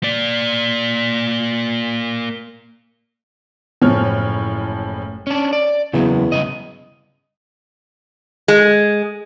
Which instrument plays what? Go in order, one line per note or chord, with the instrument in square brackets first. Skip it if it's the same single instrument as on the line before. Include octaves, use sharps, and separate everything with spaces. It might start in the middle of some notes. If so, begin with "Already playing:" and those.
[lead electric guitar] A#3 D5
[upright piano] F#1 A2 F3 C#5 F6
[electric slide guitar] C#4 D4
D5
[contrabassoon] E2 [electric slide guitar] C#3 F#3
[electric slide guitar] G2 C#3 D#5
[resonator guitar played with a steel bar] G#3